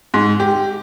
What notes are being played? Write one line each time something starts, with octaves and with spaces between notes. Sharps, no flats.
G#2
G4